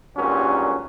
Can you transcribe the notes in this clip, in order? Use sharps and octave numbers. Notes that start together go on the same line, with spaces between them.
G#1 G2 A#2 F#3 G3 C#4